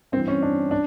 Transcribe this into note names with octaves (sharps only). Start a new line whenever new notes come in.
G2 E3 C4
C#4
D4
D4